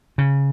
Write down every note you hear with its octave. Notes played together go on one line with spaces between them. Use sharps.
C#3